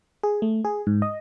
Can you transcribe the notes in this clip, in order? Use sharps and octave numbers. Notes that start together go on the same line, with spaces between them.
G#4
A3
G#4
G#2
D#5